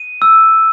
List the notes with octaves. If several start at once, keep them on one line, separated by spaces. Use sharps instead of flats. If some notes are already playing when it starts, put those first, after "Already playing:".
Already playing: D#7
E6